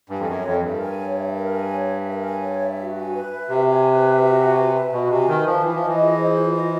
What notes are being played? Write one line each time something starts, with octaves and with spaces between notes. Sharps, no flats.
G2 G#5
F2
F#2 C#5
F2 E5
G2 A#4
G#5
C#5
E5
A#4
G#5
C#5
E5
A#4
G#5
C#5
E5
F#4
G#5
B4
E5
C3 F#4
G#5
B4
E5
F#4
G#5
B4
E5
B2 F#4
C3 G#5
D#3 B4
F3 E5
E3 F4
F3
D#5
E3
G#4
C5
F4
D#5